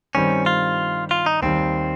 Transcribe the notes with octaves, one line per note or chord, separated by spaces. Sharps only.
G2 D#3 G3 C4 C#4
F4
F4
D#4
D#2 D#3 G3 C4